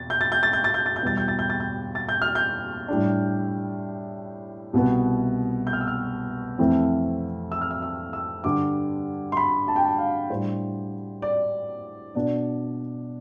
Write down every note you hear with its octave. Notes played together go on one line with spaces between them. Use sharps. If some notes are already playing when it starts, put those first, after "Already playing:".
Already playing: E2 B2 A6
G6
A6
G6
A6
G6
A6
G6
A6
G6
E2 B2 G3 B3 A6
G6
A6
G6
A6
G6
A6
G6
F6
G6
A2 G3 D4
C2 B2 B3
G6
F6
E6
F6
F2 E3 A3 C4
E6
F6
E6
E6
E6
G2 D3 G3 D6
C6
B5
A5
G5
A5
F5
A2 G3 D4 C5
D5
B2 B3 D4 D5